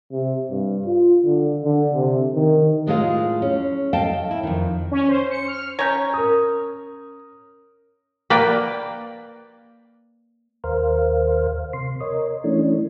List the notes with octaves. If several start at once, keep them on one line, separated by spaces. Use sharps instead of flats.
C3
G2
F4
D3
D3
C3
D#3
A2 G#3 A#3 F4 G#4 F5
C#4
A4 D#5 F5 G5 A5
E4
F2 D#3
C#4
C5
C#7
F6
C#4 C#5 A#5 G6
A#4 D#6
A#3 B4 D5 G5
D#2 A#4 C5 F5
C3 C6
A#4 C#5 D#5
E3 A3 C#4 D4